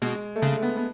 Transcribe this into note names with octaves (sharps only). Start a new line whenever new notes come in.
B2 G#3
A3
C#3 G#3
A3
B3
B3